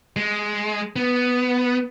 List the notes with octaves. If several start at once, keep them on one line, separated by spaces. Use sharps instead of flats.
G#3
B3